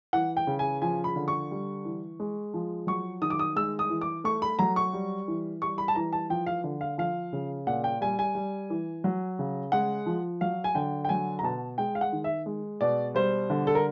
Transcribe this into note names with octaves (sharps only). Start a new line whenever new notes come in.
E3 F#5
G5
C#3
G#5
F3 G#5
B5
D3
C#6
G3
E3
G#3
F3
F#3 C#6
D#3 D#6
D6
D#6
G#3 E6
D#6
E3
D6
A3 C#6
B5
F#3 A#5
C#6
G3
E3
G3 C#6
B5
A5
E3 A#5
A5
F3 G5
F5
D3
F5
F3 F5
C#3
A#2 F#5
G5
G3 G#5
G#5
G3
E3
F#3
C#3
G#3 F#5
F3
F#3 F5
G#5
D3 G5
G5
F#3 G#5
A#5
B2 A5
G#3 G5
F5
F#5
D#3
E5
G#3
B2 D5
G3 C5
D3
A4
A#4